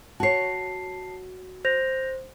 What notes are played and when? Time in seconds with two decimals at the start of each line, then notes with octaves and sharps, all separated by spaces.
0.20 F#4 C#5 A5 C7
1.65 C5 G6 A#6 F7